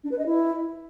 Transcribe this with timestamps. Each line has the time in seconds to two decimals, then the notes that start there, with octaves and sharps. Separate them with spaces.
0.04 D4
0.11 B4
0.18 D#5
0.26 E4